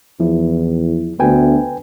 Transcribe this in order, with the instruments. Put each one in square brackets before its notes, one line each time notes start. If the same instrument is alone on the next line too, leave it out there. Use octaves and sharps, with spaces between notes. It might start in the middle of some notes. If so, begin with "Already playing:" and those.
[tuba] E2 [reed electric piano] F3 E4
[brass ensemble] D2 [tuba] B3 [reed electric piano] B4 G5 G#5